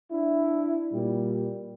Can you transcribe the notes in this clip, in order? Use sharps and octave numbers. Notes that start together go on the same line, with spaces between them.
D4 E4
A#2 G3